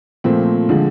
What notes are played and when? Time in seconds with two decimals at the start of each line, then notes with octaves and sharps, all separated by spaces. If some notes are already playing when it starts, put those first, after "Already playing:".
0.24 A#2 F3 A3 C4
0.69 D3 F3 G#3